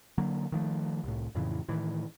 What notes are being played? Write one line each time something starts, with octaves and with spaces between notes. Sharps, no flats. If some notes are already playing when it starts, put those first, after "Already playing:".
D3 F#3 A#3
D#3 F3 A3
C2 A2
F2 A2 C#3 E3
A2 D#3 E3